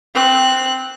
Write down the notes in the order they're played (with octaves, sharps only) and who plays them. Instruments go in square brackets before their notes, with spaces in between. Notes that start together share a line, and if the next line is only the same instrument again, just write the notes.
[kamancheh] C4 F#6